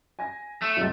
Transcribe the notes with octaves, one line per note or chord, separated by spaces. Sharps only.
G#5 A#6
A3
C#2 F#2